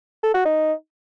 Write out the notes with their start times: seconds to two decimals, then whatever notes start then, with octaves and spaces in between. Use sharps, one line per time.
0.23 A4
0.34 F#4
0.45 D#4